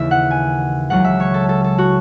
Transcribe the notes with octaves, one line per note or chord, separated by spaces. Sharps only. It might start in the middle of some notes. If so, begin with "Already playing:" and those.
Already playing: D#2 C#3 E3 E5
F#5
G#5
C#2 C#3 F#3 F#5
E5
C#5
A4
A4
A4
F#4